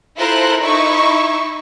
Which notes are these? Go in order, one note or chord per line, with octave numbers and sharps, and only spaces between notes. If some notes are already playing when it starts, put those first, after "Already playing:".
E4 F4 A4 A#4 C5 F#6
D#4 E4 E5 C#6